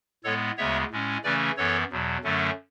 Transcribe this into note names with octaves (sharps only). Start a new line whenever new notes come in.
A2 G#3 B3 A4 C#5
D2 C#3 G#3 B3 C#5 E5
A2 G#3 C#4
C#3 E3 A3 C#4 B4 D5
F#2 E3 B3 A4 C#5
E2 B2 F#3
F#2 D3 F#3 A3 C#4